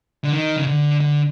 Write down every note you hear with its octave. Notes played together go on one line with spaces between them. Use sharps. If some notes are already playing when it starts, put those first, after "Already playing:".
D3
D#3
C#3
D3
D3